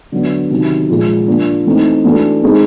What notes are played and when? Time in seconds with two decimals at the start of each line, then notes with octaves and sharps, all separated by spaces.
0.12 D3 F#3 B3
0.50 C3 D#3 F#3
0.90 A#2 F3 G#3
1.28 F3 A#3 D4
1.66 E3 A3 C4 D#4
2.05 E3 A3 D4 F#4 A4
2.43 G#3 C4 D#4 G#4